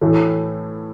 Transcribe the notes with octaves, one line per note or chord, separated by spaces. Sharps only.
A2 E3 A3